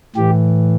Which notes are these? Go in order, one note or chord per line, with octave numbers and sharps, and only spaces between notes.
A2 E3 G4